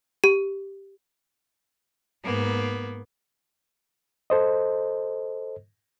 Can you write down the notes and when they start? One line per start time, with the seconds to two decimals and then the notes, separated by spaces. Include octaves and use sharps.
0.24 G4
2.22 G#2 A#3 B3
4.30 A4 C5 D#5